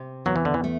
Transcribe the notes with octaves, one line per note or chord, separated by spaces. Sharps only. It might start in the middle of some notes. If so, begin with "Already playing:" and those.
Already playing: C3
E2 F#3
E3
D3
E3
A3